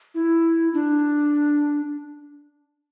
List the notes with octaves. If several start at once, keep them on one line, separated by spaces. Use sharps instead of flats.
E4
D4